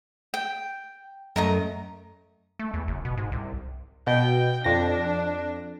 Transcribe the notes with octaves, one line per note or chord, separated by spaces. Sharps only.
G5
F#2 A3 A#4 D#5 A#5
A3
E2
F#1
B2
G#2
C2
B2 G5
F2 D4 A#6